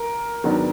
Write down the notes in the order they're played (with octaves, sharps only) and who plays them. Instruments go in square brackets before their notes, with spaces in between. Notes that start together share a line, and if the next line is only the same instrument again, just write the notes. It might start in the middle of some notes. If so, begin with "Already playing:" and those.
Already playing: [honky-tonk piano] A#4
[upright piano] G#2 D#3 F#3 B3 D4